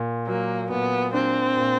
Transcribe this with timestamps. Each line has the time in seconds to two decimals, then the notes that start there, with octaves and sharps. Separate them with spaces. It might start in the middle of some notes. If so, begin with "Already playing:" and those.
Already playing: A#2
0.27 F#3 A#3
0.70 A#2 B3
1.13 C4 D4
1.56 A#2